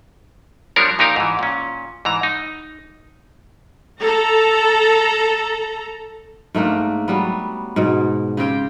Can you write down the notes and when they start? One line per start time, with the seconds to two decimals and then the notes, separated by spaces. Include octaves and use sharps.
0.76 F3 G3 B3 D4 A#4 C#5
0.99 A#2 F3 D#4 G4 A#4 F5
1.16 G#2 E3
1.39 A#2 C#4
2.05 G#2 E3 A#5
2.23 D#4
4.01 A4 A#5
6.55 G#2 A3 A#3 D4
7.08 F#3 G3 B3
7.76 G#2 B2
8.37 C#3 C4 G4 G5